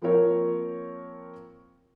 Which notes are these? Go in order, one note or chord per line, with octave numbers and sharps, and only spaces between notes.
F3 A#3 C4 F4 A#4 C#5